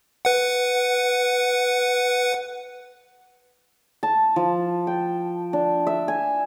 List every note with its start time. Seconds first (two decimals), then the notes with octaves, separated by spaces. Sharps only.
0.25 B4 F#5
4.03 A5
4.36 F3
4.87 G5
5.53 D4
5.87 E5
6.08 G#5